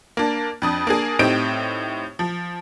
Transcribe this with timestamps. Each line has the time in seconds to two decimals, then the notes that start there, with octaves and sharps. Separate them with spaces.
0.17 A#3 D4
0.62 F2 D4 D#6
0.87 A#3 D4 G#4
1.19 A2 C4 D#4 G4 D7
2.19 F3